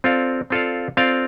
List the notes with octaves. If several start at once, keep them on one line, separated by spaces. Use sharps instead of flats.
C4 F4 A4 D5 F5
C4 F4 A4 D5 F5
C4 F4 A4 D5 F5